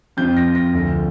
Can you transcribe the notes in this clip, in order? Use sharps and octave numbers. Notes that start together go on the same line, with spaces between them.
F2 F3 C4 G6
A#6
A#6
D2 D3 F3